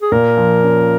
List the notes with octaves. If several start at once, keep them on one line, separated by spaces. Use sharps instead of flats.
G#4
A#2 A#4
F3
C#4